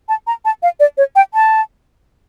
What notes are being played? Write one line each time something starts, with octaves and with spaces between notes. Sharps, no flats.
A5
A#5
A5
F5
D5
C#5
G5
A5